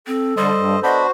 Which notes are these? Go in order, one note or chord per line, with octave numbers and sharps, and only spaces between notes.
C4 A4
D3 G3 C5 D#5
G2
B3 D4 F#4 C5 D#5 B5